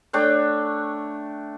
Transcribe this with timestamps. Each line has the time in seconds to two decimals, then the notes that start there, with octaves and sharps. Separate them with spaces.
0.13 A3 D4 C#5 G5